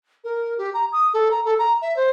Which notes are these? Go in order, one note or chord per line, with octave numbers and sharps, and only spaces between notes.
A#4
G4
A#5
D#6
A4
A#5
A4
A#5
E5
C5